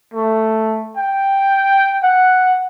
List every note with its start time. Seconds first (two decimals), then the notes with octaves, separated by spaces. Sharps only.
0.14 A3
0.97 G5
2.03 F#5